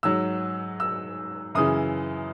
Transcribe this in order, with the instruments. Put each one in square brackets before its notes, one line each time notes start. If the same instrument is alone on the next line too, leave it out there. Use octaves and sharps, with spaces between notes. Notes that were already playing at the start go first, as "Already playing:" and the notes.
[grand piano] G#2 F#3 E6
E6
F#2 C#3 E3 D#6